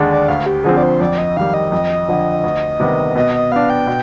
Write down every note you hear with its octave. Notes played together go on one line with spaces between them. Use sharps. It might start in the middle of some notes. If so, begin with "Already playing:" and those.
Already playing: D#2 D3 G#3 D4
D5
D2 F5
G4
D3 F3 C4 G#4
D5
C5
F2 D5
D#5
D#3 G3 F5
D#5
F2 D#5
D3 F3
D2
C3 D#3 G3 B3
B2 D#5
D#5
B3 D4 F5
G5
B2